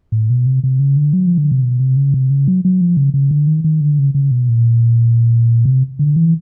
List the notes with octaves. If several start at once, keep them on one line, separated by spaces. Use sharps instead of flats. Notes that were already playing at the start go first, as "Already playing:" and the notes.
A2
B2
C3
C3
C#3
D3
F#3
F3
D3
C3
B2
C3
C#3
C3
C#3
F#3
F#3
F3
C#3
C#3
D3
D#3
D#3
D3
C#3
C#3
B2
A#2
C3
D3
E3